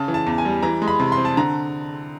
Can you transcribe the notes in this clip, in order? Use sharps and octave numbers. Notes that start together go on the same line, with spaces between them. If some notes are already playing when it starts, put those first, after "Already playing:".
Already playing: C#3 A5
E3
A5
E2
G#5
G3
E3 A#5
G#3
B5
C3
C6
C4
A5
D3 A#5